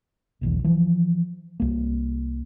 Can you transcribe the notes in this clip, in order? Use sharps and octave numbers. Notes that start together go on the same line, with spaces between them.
D#1 B1 E2
E3 F3
C2 A#3